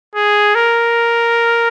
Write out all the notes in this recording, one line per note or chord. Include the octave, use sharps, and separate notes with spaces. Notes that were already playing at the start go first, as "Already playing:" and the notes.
G#4
A#4